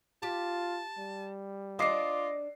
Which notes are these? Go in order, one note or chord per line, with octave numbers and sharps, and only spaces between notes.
F4 G4 A5
G3
D4 F4 C5 D#5 D6 C7